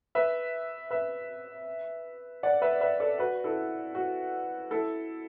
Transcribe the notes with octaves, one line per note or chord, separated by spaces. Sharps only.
B4 E5
B4 E5
D5 F#5
B4 E5
B4 E5
A4 D5
F#4 B4
E4 A4
F#4
E4 A4